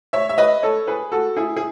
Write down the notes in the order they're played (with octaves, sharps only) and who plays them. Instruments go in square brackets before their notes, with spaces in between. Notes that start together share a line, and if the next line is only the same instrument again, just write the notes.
[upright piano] C#5 E5
E5
B4 D#5
A4 C#5
G#4 B4
F#4 A4
E4 G#4
G#4